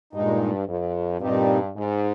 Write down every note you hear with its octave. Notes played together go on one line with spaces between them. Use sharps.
G2 A#2 G#3 D#4
F2
G2 A#2 G3 C4 D#4 G4
G#2